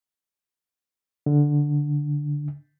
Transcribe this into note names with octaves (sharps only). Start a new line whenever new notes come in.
D3